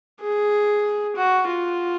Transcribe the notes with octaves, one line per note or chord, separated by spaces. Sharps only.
G#4
F#4
F4